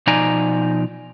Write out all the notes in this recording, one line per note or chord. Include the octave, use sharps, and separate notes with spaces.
B2 F3 D#4 D5 G#5 A#5